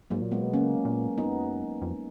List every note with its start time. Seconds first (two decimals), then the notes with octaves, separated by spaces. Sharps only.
0.10 G#2 F#3 A#3
0.22 A#2
0.32 G#3 B3
0.42 B2
0.53 C#3 A#3 C#4
0.85 A#2
1.18 F#2 B3 D#4
1.82 F2